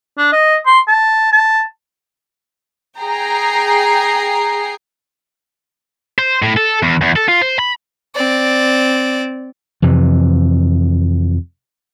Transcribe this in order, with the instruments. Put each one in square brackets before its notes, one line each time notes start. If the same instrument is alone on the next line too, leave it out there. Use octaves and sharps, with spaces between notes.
[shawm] D4
D#5
C6
A5
A5
[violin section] G#4 G5 A#5 C7
[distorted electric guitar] C5
A2
A4
E2
E2
A4
F4
C5
B5
[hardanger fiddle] C4 D5
[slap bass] F2 C3 E3